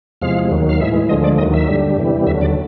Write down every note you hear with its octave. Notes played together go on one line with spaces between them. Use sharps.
E2 C3 F3 G#3 F5
D#2 D#3 F#3
F5
A2 E3 G#3 E5
D2 D3 F3 G#3 D#5
D5
D#2 D#3 F#3 D#5
E5
G2 D3 G3
E2 C3 E3 G3
D#2 D3 F#3 E5
D5